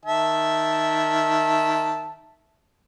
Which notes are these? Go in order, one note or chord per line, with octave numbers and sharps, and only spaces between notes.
D#3 E5 A5